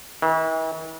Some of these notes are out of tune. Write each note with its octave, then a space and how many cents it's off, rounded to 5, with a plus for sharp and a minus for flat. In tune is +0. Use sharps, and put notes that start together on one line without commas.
E3 -45